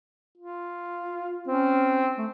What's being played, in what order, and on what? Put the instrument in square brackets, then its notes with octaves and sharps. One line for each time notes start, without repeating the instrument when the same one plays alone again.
[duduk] F4
[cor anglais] C4 [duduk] C#4
[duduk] A3